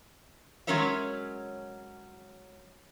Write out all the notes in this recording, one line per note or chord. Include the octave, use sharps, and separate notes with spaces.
F#3 G#3 C#4 A#4 C#5 E5